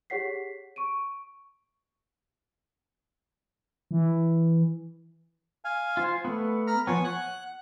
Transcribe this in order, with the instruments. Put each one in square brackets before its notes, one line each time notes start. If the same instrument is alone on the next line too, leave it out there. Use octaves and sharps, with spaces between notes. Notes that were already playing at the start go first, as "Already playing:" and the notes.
[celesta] G4 G#4 C#5 F#5 B6 C7
C#6 D7 D#7
[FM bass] E3
[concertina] F5 G#5
[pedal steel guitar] F4 C5
[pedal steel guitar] A3 B3 [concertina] B4
[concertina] A#5 B5 F6
[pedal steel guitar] F3 B3 [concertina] C#5 G#5
[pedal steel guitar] F#5 [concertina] F#6